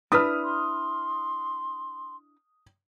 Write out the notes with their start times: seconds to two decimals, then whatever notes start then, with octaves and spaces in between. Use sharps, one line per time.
0.12 D4 E4 B4 D#6 F6
0.43 C6